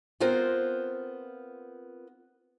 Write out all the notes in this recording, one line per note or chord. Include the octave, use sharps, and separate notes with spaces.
B3 C4 F4 A#4 C5